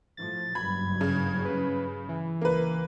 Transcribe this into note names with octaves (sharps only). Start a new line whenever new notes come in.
A2 F3 A6
F#1 G2 F#3 B5 G#6
C#3
B4
E3
C#2 A#3 B4